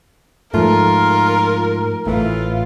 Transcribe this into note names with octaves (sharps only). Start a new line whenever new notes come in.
G#2 F3 A3 F4 A#4
A1 A2 E3 F4